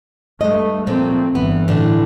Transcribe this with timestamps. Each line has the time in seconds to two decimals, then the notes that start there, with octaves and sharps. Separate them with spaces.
0.41 G2 A3 D#5
0.87 A#2 F3 A3 C4
1.35 G1 E3 B3
1.68 A2 D3